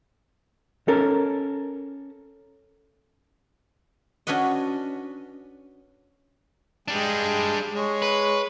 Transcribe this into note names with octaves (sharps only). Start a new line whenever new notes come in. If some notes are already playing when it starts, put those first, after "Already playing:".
C#4 A4 A#4
C#4 D4 F#4 B4 D#5
G3 G#3 D4 G5
G#3 C#5
B4